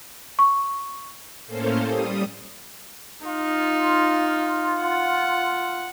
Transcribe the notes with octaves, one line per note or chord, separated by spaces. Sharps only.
C#6
A2 A#3 C#4 A4 C5 F5
G3 D#6
D#4 F4
F#5